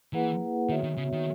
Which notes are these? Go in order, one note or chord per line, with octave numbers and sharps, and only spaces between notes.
E3 A#3 E4 G#4 B4 F#5
D#3 B3 F#4 C#5 E5
D#3
C#3
D#3